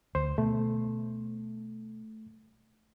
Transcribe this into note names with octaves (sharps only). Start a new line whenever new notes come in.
D2 C5
B2 A3